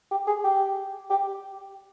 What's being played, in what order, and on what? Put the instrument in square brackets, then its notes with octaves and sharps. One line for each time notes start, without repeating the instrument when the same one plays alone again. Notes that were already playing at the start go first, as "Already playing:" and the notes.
[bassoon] G4
G#4
G4
G4